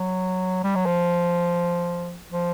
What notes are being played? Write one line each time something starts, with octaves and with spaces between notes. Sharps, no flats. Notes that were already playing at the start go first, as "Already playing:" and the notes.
Already playing: F#3
G3
F#3
F3
F3